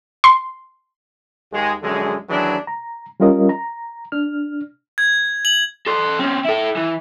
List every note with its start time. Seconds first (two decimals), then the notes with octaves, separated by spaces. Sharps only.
0.24 C6
1.52 D#2 G#3
1.82 A#1 F#2 D3 G#3
2.29 D#2 E3 F#3 G#3 D4
2.67 A#5
3.20 G3 C#4 F4 A#4 D#5
3.49 A#5
4.12 D4 F6
4.98 G#6
5.45 F#7
5.87 A4 C5
6.19 C4 C#4
6.45 E4 A4
6.77 E3